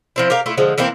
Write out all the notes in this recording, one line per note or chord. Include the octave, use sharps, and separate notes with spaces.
F3 C4 E4
G4 A#4 F5
A3 E4 F4
D3 F3 G#3
E3 A#3 C4 E4